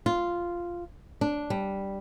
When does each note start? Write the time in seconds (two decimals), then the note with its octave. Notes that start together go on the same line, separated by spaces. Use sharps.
0.06 F4
1.21 D4
1.50 G3